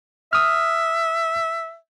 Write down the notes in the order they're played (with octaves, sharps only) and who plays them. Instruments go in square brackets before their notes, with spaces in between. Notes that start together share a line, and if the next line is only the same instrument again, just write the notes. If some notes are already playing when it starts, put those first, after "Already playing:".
[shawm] E5 [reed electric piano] D#6 F6